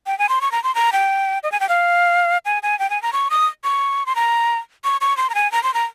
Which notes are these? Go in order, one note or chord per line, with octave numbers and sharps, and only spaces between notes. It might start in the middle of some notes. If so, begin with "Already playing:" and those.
G5
G#5
C6
C#6
A#5
C6
A#5
G5
D#5
G#5
G5
F5
G#5
G#5
G5
G#5
A#5
C#6
D#6
C#6
C6
A#5
C#6
C#6
C6
A#5
G#5
A#5
C6
A#5